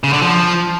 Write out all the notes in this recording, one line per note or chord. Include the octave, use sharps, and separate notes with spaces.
C#3
D3
F3